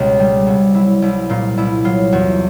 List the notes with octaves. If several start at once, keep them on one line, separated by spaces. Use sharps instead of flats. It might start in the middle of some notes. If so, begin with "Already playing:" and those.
Already playing: C#2 B2 G4
G3
C2 F#4
F#3 E4
C2 E4
A#2 F4
C2 E4
F#3 F4
E2 F#4